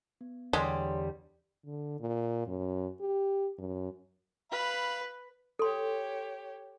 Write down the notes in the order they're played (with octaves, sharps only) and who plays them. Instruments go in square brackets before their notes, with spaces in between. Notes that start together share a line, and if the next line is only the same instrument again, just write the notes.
[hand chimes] B3
[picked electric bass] E2 D3 [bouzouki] G3 [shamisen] G#3 [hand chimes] C#5 C6
[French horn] D3
A#2
F#2
G4
F#2
[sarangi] B4 [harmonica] F5 B5
[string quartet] G4 C#5 [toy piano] A4 C6